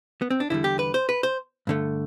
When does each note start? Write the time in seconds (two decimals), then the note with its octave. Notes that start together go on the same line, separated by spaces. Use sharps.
0.22 B3
0.31 C4
0.40 D4
0.50 E2 D3 G3 E4
0.64 G4
0.79 B4
0.94 C5
1.09 B4
1.23 C5
1.67 G2 D3 A3